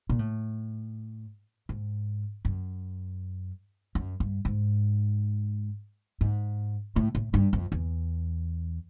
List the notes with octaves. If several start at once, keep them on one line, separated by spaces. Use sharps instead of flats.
A#2
A2
G#2
F#2
F#2
G2
G#2
G#2
A2
A2
G2
F2
E2